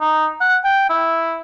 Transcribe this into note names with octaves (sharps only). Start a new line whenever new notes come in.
D#4
F#5
G5
E4